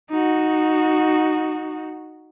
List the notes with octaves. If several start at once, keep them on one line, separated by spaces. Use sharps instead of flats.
D#4 F#4